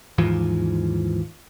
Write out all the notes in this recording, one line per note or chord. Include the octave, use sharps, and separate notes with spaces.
D#2 G#2 E3 F3